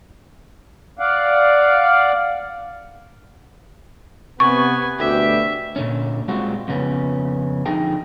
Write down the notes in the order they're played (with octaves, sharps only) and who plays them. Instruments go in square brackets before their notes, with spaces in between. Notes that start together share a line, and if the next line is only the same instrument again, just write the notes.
[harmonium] D5 F5 F#5
[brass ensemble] C3 B3 [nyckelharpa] B4 G#5 [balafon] C#6
[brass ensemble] D2 B2 G4 [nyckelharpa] E5
[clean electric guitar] A#2 D3 C#4
G3 G#3 C4 F4 F#4
F2 C#3 B3 C#4
F2 D3 D#4 G#4 G5